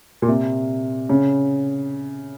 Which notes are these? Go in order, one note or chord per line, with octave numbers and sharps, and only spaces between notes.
A#2
C3
C#3